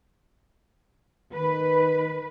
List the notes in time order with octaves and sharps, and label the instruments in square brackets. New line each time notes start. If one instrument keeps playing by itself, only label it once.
[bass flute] D#3 [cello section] B4